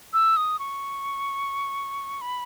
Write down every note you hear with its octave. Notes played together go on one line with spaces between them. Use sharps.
E6
D#6
C#6
B5